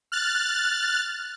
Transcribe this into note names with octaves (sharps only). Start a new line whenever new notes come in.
F6 F#6 A6